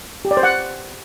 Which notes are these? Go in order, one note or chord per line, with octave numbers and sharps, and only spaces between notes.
G4
D5
C5
F#5